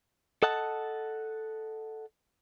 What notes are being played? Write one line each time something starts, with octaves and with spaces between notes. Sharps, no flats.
A4 D#5 F#5 A5